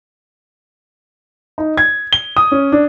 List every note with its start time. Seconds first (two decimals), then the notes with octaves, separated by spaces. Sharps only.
1.58 D#4
1.77 G#6
2.13 G7
2.37 D#6
2.52 C#4
2.72 D4